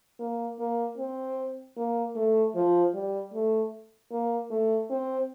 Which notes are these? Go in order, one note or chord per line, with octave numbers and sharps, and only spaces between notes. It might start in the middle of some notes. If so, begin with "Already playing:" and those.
A#3
A#3
C4
A#3
A3
F3
G3
A3
A#3
A3
C4